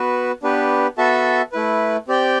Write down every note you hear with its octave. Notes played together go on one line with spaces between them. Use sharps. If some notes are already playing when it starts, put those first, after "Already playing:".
Already playing: B3 F#4 B4
B3 D4 G4 B4
B3 F#4 A4 E5 A5
A3 E4 B4
C4 G4 D5 G5